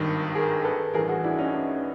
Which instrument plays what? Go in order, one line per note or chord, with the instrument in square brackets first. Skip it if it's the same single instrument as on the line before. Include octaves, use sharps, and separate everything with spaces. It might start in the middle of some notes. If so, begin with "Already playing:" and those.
Already playing: [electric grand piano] G#1 G2 D#3
[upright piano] G#4 A#4
A4 B4
[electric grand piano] A1 G2 E3 [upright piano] G#4 A#4
[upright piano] F#4 G#4
D4 E4
C#4 D#4
D4